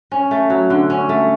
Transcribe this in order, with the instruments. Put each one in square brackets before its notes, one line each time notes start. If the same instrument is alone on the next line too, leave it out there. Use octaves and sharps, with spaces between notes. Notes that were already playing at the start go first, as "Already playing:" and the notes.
[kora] C#4
A3
F#3
D3
C#4
A3